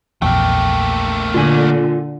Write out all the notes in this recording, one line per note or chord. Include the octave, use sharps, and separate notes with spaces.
A#1 E2 A3 A#3 G5
A#2 D3 F4 G#5